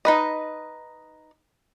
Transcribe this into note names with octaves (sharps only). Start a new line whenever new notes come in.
D#4 B4 D#5